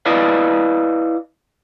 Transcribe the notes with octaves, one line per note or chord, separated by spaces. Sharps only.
E4 B4 D5 D#5 F5